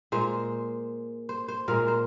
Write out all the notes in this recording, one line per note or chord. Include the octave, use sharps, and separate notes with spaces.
A#2 G#3 C5
C5
C5
A#2 G#3 A#4
C5